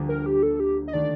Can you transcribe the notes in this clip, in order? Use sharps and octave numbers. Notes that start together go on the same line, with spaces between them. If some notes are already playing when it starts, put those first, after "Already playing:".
Already playing: D2 D3 G3 A#3 F4
A#4
G4
A4
G4
D#5
D#3 A3 D4 D5